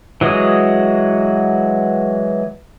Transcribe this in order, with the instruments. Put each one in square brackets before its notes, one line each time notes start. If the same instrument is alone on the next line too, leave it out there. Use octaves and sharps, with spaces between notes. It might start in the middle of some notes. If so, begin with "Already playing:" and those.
[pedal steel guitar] E3 F#3 G#3 F#4 D#6